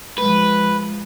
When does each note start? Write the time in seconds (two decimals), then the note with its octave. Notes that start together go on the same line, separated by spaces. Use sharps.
0.18 F3 G#3 B4